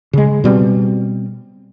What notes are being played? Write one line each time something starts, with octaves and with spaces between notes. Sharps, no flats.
C#3 G#3
B2 G3 A#3 C4